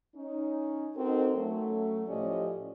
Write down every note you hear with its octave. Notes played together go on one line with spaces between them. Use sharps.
C#4 D#4
C4 D#4 F#4 A4 A#4
F#3 A3 C#4
A2 F3 C#4 G4 D5 D#5